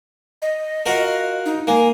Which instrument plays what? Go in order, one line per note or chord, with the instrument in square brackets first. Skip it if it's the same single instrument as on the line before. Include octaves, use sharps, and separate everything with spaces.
[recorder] D#5
[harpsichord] F4 F#4 A#4
[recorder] D#4
[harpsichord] A#3 [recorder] G#5